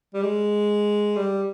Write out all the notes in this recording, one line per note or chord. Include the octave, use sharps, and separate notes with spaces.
G3
G#3
G3